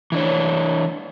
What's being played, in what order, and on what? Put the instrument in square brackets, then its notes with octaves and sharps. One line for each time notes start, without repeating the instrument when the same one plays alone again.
[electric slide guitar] E3 D4 C#5